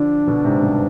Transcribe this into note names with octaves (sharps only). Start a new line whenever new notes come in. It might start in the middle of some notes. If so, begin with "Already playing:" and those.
Already playing: D3 F3 D4
B2 D3
G#2 C3
G2 B2